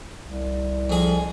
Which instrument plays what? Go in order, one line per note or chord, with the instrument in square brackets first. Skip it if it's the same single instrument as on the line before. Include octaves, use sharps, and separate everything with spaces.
[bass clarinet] C2
[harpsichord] F2 G#4